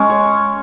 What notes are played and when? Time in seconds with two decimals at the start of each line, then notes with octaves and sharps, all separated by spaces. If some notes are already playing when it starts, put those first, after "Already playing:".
Already playing: G#3 C#4
0.10 C#5